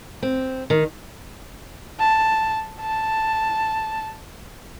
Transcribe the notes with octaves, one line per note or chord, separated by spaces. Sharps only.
C4
D#3
A5
A5